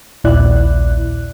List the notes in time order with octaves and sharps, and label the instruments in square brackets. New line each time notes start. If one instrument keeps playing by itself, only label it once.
[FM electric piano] A#1 D#2 A#2 E4 D5 F#6